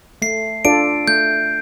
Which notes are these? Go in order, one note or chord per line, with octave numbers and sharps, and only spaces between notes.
A3 C7
D4 F4 A4 D5 D7
A3 G6